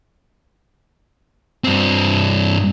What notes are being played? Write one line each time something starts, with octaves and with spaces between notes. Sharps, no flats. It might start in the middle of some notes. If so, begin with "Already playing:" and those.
G2 C4